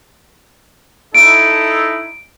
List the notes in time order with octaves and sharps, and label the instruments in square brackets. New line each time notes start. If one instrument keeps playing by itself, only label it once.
[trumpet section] D#4 E4 A4 [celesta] D7